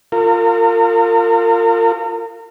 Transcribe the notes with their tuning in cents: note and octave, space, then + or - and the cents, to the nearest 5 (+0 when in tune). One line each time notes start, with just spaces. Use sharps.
F4 +0 A#4 -35